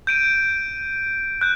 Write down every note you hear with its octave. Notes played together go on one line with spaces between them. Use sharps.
G6 D7 D#7
F#6 G6